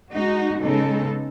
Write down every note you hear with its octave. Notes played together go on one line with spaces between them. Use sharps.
G#3 D#4 F#4
C#3 G#3 B3 D#4 A4